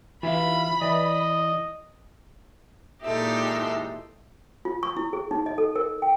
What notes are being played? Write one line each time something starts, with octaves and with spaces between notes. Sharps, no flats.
E3 F4 E5 F5 B5
E3 D5 D#5
A#2 E3 G#3 D#4 G4 A4 E5 C6
F4
C#6
E4
G#4
D#4
D#5
A4
A#4
G5